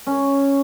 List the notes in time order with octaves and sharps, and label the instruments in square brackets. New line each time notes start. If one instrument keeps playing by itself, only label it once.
[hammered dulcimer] C#4